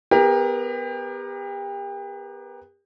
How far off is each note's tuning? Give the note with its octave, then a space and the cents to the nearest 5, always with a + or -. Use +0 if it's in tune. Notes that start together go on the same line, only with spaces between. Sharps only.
B3 +5 G4 +35 A#4 +15